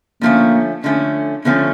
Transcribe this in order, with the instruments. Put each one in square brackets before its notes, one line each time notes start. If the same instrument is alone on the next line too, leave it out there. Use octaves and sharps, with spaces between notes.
[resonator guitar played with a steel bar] D3 F3 A3 C#4 [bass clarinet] A#3
[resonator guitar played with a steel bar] D3 F3 A3 C#4
[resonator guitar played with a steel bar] D3 F3 A3 C#4 [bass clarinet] B3